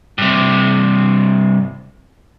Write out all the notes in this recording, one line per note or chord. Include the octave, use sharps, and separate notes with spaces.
G2 C3